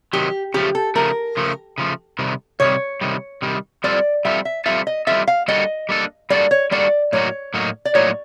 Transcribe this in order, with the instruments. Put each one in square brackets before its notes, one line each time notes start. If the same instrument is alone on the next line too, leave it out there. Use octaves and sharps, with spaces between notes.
[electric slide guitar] C3 D#3 F#3 [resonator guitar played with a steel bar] G4
[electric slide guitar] C#3 F3 A3 [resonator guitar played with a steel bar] G4
[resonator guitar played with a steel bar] A4
[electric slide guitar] C#3 F3 A3 [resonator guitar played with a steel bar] A#4
[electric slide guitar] C#3 F3 A3
C#3 F3 A3
C3 D#3 G3
[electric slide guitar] C3 D#3 G3 [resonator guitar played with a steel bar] C#5
[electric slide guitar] C3 D#3 G3
C3 D#3 G3
[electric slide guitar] G3 C4 F4 A4 [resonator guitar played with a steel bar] D5
[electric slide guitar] G3 C4 F4 A4 [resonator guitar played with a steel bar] E5
[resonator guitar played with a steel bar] E5
[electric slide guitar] G3 C4 F4 A4 [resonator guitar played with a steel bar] E5
[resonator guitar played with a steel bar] D#5
[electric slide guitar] G3 C4 F4 A4 [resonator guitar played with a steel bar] E5
[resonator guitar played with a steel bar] F5
[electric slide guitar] G3 A#3 D4 F#4 A4 [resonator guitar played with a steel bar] D#5
[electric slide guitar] G3 A#3 D4 F#4 A4
[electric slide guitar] G3 A#3 D4 F#4 A4 [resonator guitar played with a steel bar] D5
[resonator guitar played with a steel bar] C#5
[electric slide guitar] G3 A#3 D4 F#4 A4 [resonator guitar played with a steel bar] D5
[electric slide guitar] A2 F#3 A#3 D#4 F#4 [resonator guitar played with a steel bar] C#5
[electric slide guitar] A2 F#3 A#3 D#4 F#4
[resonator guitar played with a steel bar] D5
[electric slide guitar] A2 F#3 A#3 D#4 F#4 [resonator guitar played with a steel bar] C#5